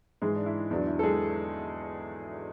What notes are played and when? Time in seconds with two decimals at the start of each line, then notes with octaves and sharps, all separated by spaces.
0.22 G#2 E3 G#3 G#4
0.35 D4
0.46 E4
0.70 E2 D3 F#3 D4
0.87 E4
0.99 A4
1.03 G#3 G#4